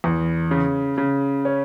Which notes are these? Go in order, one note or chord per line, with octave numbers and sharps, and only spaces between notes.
E2
C#3
C#3
C#4